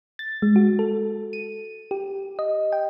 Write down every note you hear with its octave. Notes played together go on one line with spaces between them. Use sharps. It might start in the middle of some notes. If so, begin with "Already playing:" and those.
A6
G#3
F#4
A4
D#7
G4
D#5
G5